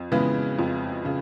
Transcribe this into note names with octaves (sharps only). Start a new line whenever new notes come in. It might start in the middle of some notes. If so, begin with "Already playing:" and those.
Already playing: F2
C#3 E3 G#3 B3
F2
C#3